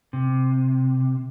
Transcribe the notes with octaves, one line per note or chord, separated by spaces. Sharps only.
C3